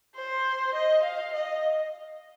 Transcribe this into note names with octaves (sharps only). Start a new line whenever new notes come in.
C5
D#5
F5
D#5